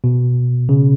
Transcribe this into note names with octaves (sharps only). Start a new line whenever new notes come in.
B2
C#3